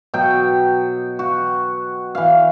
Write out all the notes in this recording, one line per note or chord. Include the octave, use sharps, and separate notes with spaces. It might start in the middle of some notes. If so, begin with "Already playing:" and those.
B2 F#3 G5
F#4
E3 F5